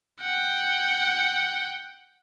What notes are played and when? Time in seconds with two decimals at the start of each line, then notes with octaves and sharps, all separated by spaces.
0.21 F#5 G5